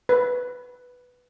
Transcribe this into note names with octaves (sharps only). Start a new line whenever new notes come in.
B4